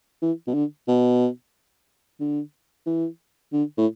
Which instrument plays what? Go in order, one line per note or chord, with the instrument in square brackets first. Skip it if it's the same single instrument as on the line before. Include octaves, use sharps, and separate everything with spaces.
[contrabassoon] E3
B2
D3
B2
D3
E3
D3
A2